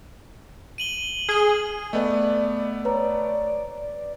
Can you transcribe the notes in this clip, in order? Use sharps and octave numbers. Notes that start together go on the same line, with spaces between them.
D#7 F#7 G7
G#4 F6 D#7
A3 B3 D5 D#5
B4 C#5 A#5